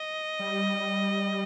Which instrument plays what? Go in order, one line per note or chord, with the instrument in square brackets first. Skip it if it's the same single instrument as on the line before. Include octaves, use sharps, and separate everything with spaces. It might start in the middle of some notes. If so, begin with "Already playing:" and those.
Already playing: [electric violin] D#5
[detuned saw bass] G3